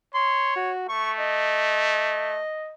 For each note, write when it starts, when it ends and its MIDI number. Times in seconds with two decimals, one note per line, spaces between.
0.14 0.72 73
0.14 0.54 84
0.56 0.88 66
0.89 2.40 57
0.89 1.13 85
1.19 2.74 75